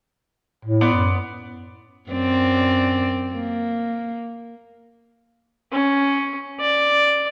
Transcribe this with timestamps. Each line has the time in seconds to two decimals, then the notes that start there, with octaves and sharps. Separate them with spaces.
0.65 A2
0.81 B3 D5 C6
0.93 F#2
2.10 F#2 C4 D5
3.35 A#3
5.72 C#4
6.60 D5